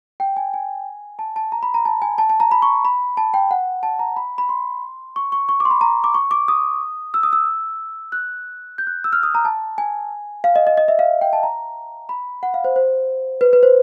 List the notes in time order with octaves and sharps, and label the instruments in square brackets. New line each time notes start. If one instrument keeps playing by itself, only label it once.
[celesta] G5
G#5
G#5
A5
A5
A#5
B5
A#5
A5
G#5
A5
A5
A#5
B5
C#6
B5
A5
G5
F#5
A5
A#5
B5
B5
C6
C#6
C#6
C#6
D6
C6
B5
A#5
D6
C#6
D6
D#6
E6
D#6
E6
F#6
G6
F#6
E6
F6
D#6
A#5
A5
G#5
F5
D#5
D#5
D#5
E5
F5
G5
A5
A#5
B5
F#5
F5
C5
C5
B4
B4
C5